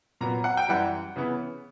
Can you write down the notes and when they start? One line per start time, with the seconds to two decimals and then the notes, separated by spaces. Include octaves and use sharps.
0.21 A#2 F#3 B3 A#5
0.44 F#5
0.57 G5
0.68 F#2 E3 G3 F#5
1.16 C#3 E3 B3